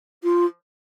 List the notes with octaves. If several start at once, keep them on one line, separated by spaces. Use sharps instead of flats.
F4